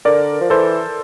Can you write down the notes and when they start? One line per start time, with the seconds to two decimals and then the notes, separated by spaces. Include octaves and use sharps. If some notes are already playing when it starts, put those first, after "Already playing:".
0.05 D3 A#4 D5
0.41 F3
0.50 E3 A4 C5